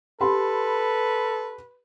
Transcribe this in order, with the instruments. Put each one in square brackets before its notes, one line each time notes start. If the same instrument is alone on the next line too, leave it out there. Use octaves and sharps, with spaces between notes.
[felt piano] G4 B5 C6 [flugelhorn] A4 [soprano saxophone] B4